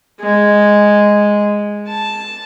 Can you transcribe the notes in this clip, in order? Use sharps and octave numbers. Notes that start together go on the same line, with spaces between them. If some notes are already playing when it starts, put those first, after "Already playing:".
G#3
A5